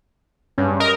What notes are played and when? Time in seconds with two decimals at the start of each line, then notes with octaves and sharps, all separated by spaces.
0.58 G2 C#4
0.80 A#4 D#5